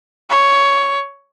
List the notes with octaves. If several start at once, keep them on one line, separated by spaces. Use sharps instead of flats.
C#5